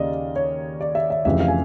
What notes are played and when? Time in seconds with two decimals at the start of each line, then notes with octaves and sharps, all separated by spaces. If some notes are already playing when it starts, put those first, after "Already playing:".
Already playing: D#2 C#3 A#3 D5 D#5 F5
0.36 C#5
0.81 D5
0.95 E5
1.10 E5
1.25 F1 F2 C#3 E3 E5
1.40 F5
1.48 G#5